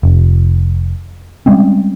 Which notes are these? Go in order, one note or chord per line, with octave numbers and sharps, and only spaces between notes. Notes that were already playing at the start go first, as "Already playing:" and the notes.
F1
G3 G#3 C4 C#4